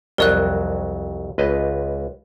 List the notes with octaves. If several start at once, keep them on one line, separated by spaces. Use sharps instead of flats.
C2 F2 F#3 A#4 D5 F#6
C#2 B4 D#5